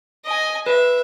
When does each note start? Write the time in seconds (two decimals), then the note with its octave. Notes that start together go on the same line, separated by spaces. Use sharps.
0.25 D#5 G#5
0.66 B4 E5